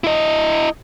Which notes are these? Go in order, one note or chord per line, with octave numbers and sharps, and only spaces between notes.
E4 D#5